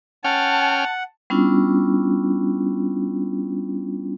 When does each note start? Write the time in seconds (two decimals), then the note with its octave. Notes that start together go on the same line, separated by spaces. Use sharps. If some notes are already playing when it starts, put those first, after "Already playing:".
0.24 C#4 F#5 G5 A5 F6
1.30 G3 B3 C#4 D4 E4 F4